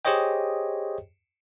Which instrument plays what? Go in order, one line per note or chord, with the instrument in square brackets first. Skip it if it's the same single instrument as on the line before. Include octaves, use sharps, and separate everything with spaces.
[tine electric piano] G4 G#4 C5 C#5 D#5 G5